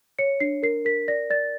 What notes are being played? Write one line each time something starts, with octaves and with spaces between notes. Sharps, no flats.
C#5 C#7
D4 C7
A#4 C7
A#4 B6
D5 A#6
D5 A6